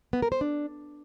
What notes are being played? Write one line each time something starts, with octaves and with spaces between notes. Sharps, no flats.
B3
A#4
C5
D4